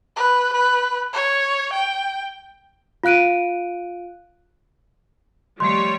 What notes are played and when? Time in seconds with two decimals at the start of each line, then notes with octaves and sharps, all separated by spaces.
0.17 B4
0.53 B4
1.13 C#5
1.73 G5
3.04 F4 F5 F#6 D7 D#7
5.60 D#3 F3 G3 A3 C#5 C6